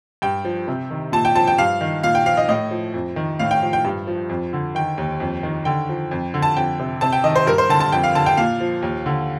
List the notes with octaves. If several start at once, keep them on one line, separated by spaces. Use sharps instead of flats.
G2 G5
F3
C3
D#3
A#2 A5
G5
F3 A5
G5
G2 F5
D#3
A#2 F5
G5
F3 F5
D#5
A2 D#5
F3
F2
D#3
A2 F5
G5
F3
G5
G2
F3
F2
D3
D#3 G5
D#2
F2
D#3
D3 G5
F3
F2
D3
A5
F2 G5
C3
C3 A5
G5
D#3 D#5
C5
G2 A#4
C5
D3 A5
A5
F2 G5
F5
D3 A5
G5
A#2 F5
F3
D#2
D3